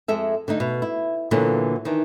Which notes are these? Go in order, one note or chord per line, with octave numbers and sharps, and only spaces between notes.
F2 G#3 A4 E5
D3 A3 D#4
B2
E4
A#2 D3 E3 F#3 A#3 B3
D#3 E3 D4